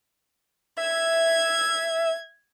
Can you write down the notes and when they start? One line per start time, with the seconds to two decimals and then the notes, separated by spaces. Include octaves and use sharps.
0.77 E5 G#6